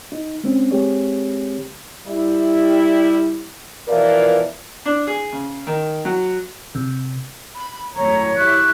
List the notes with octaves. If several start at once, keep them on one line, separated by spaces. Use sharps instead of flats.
D#4
G#3 C4 C#4
G#3 C4 G4 G#4 C#5
G3 E4
B2 E3 F3 F4 A#4 D5
D4
G#4
C#3
D#3
F#3
C3
B5
G#1 F#2 A2 C#5 A#5
E4 G4 C#6 F#6